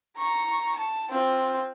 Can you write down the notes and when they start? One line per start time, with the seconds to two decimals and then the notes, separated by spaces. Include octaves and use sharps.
0.18 A#5 C#6
0.76 A5
1.10 C4 F4